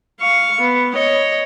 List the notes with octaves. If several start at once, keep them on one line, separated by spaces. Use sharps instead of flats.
F5 C#6
B3
C#5 D#5